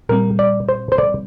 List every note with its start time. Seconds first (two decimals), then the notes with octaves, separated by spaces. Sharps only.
0.09 A#2 G3 C4 A#4
0.39 D5
0.69 C5
0.92 C5
0.98 D5